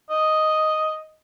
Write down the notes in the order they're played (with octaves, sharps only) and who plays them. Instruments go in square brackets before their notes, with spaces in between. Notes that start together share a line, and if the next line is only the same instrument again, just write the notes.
[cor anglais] D#5